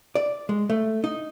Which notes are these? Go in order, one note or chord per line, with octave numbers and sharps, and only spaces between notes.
D5
G#3
A3
D#4